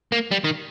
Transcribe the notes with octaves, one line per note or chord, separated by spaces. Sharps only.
A#3
G3
D#3